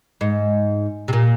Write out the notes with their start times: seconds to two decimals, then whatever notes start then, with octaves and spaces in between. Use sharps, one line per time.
0.21 G#2
1.08 C3
1.13 A#2